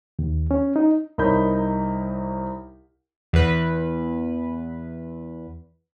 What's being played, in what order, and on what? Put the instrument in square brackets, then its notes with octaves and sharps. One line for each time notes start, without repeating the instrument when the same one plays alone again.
[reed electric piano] D#2
C#4
D#4
[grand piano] C2 D#4 A#4 C#5 B5 G6
[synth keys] E2 B4